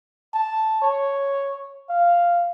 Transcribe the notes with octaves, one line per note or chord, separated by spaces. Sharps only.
A5
C#5
F5